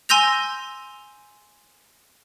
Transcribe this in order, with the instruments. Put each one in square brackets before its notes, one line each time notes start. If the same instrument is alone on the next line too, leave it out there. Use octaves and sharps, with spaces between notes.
[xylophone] G#5 C6 E6 G6 A#6 F7